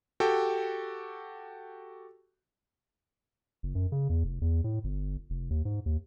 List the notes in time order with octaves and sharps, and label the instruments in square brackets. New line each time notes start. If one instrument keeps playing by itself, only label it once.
[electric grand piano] F#4 G4 A4 G5
[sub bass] F#1
F#2
C#3
E2
F1
E2
A2
G1
F1
D#2
G#2
D#2